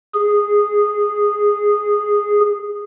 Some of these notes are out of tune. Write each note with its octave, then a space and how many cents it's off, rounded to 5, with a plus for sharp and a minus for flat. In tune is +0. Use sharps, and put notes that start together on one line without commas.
G#4 -10